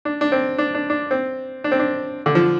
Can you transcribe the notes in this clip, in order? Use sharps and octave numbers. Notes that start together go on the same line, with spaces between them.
D4
D4
C4
D4
D4
D4
C4
D4
C4
D4
D3
F3